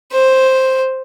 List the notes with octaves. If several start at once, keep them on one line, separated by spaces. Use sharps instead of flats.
C5